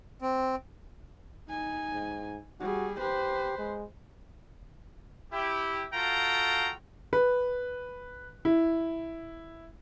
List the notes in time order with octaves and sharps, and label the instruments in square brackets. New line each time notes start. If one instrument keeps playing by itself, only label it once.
[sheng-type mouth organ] C4
[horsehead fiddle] D#4 G#5
[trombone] G#2
[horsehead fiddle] G3 G#4 [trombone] F#4
[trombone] G4 [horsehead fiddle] B4 C5
[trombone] G#3
[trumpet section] E4 G4
F4 F#4 A4 G5 A#5
[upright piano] B4
E4